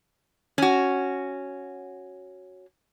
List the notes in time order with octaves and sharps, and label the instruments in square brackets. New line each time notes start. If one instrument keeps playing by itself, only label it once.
[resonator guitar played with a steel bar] C#4 F#4